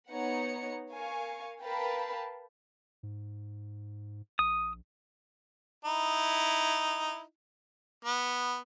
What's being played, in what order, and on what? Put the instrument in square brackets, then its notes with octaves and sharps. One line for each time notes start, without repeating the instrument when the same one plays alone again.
[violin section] B3 D#4 C#5 F#5 C#7
A#4 F5 G#5 C#6
A#4 B4 F5 G5 A5 B5
[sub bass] G#2
[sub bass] A#1 [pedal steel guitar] D#6
[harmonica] D#4 E4
B3